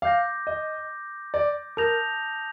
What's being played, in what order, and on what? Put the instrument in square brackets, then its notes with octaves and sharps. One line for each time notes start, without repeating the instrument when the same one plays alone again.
[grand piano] F5 [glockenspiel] D6 G6 A#6
[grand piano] D#5
D5
[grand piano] A#4 [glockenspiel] A5 D#6 G6 A#6 F7